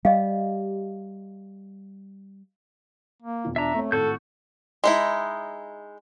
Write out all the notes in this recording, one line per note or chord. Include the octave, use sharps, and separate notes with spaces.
G3 D#5 F5
A#3
E1 F4
D4 E5 A#5
A3 C4 C#5
G#1 A2 F#4 A4 G6
G#3 D#4 E4